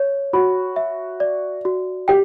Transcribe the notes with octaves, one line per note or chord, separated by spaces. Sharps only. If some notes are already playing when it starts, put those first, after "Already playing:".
Already playing: C#5
F#4 B5
E5
D5
F#4
G4 G5